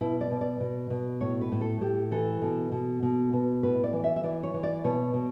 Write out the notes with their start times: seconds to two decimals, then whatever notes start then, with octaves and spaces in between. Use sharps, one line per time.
0.01 B2 E4
0.21 D5
0.31 B2
0.41 D5
0.60 B2
0.90 B2
1.21 A2 C#5
1.41 B4
1.52 A2
1.61 A4
1.81 A2 G4
2.11 E3 A4
2.42 B2
2.72 B2
3.03 B2
3.33 B2
3.63 A2 B4
3.84 D5
3.93 E3
4.04 E5
4.16 E5
4.23 E3 D5
4.43 C#5
4.54 E3
4.63 D5
4.84 B2 C#5
5.14 B2